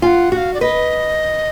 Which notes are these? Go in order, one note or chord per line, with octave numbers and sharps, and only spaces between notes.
F4 F#5 G#5
F#4 F#5
F5
D5
B4 D#5